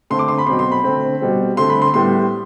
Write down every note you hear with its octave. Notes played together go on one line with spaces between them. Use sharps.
D3 A3 C4 C6
D6
C6
B5
B2 F#3 C4 C6
C6
B5
D3 A3 C4
B2 G3 C4
D3 A3 C4 C6
B5
C6
A2 G3 B3 C6